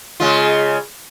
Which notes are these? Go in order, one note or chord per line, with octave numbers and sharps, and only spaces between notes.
C#3 G#3 F4